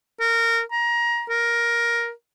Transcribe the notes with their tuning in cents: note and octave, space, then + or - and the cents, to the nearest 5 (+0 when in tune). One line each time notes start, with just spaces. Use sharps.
A#4 -20
A#5 +25
A#4 +10